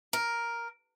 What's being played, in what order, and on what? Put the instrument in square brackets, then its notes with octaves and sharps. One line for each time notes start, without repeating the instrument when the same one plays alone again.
[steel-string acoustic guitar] A#4